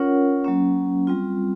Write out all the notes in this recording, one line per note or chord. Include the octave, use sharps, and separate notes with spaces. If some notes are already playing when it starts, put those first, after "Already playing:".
Already playing: C#4 F4 A#4 C#5 F#5
F#3 A#3 C#4
G3 C4 F4